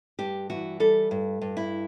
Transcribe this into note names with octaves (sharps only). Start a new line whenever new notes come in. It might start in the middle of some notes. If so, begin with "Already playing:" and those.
G2 G4
E3 F#4
G3 A4
G2
G2
E4